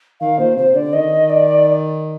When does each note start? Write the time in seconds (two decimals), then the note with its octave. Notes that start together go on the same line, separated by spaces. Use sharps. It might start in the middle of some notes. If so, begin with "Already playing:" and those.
0.20 D#3 F5
0.39 A#2 C5
0.57 C3 C5
0.75 D3 D5
0.93 D#3 D#5
1.30 D5